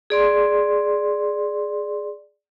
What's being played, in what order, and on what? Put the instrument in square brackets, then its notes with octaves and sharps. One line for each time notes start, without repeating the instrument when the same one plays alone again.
[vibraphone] G#4 D5 C6